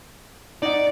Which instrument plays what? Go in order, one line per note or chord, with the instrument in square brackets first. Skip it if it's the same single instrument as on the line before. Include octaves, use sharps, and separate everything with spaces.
[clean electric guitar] D#4 D#5 F#5 [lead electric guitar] D5